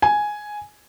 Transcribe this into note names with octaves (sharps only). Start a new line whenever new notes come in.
G#5